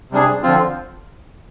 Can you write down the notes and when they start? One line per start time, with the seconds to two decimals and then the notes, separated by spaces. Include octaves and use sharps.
0.12 C3 G3 D4 G#4
0.43 D3 F3 C4 F4